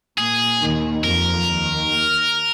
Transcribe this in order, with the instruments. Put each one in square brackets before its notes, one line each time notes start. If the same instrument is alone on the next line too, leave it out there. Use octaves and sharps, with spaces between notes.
[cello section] A#2 [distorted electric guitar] G#4
[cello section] D#2 D#3
[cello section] F2 F3 [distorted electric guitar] A#4
[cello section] D#2 D#3